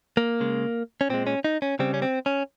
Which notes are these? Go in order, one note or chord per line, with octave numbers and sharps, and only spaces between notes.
A#3
C#3 G#3
C#4
A#2 G#3 C4
C#4
D#4
C#4
C#3 G3 C4
C#4
C4
C#4